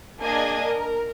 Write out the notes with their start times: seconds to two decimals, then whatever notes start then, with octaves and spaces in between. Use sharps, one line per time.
0.22 A#3 D4 G#4 D#5 G#5 G#6
0.64 A#4